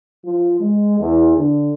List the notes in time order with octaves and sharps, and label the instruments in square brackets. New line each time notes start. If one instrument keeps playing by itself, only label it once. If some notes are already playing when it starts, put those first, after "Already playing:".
[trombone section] F3
G#3
E2
D3